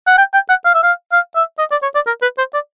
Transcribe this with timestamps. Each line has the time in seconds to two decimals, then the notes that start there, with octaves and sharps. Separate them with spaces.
0.07 F#5
0.18 G5
0.33 G5
0.49 F#5
0.65 F5
0.74 E5
0.83 F5
1.12 F5
1.35 E5
1.59 D#5
1.71 D5
1.82 C#5
1.94 D5
2.06 A#4
2.22 B4
2.38 C5
2.54 D5